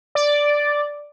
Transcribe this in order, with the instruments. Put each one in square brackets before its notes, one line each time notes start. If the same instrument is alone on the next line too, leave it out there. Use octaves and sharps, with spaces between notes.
[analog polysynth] D5